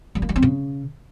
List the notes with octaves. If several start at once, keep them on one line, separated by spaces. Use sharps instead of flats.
G3
A#3
G3
C4
C#3